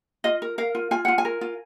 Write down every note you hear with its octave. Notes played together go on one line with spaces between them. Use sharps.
F4 D#5
A#4
A#4 F5
F4
F4 G#5
F4 F#5
G#5
A#4
F4